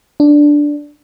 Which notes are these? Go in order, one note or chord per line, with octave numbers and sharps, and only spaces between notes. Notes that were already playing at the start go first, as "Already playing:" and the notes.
D4